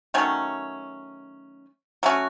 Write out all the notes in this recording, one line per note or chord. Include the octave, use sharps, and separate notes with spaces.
D#3 F#3 A3 C#4
F#3 A3 C#4 F#4